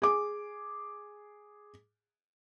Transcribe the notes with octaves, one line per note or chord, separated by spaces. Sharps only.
G#4 D6